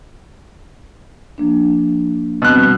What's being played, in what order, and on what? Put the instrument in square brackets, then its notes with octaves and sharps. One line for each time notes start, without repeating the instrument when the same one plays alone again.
[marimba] F3 A#3 D4
[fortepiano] B2 F#6 [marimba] G3 C4